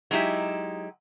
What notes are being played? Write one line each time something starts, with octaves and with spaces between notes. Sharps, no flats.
F#3 G#3 D#4 E4 G4